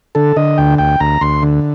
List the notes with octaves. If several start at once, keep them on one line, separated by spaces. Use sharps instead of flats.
D3 A4
D3 D#5
D2 G5
D2 G5
D2 A#5
D2 C6
D3